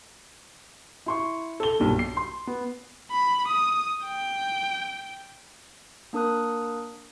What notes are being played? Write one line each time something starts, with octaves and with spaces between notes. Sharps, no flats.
E4 C6 C#6
A4 G7
B1 G2 A#2
C7
C6
B3
B5
D#6
G5
A#3 D4 A#4 D#6 F#6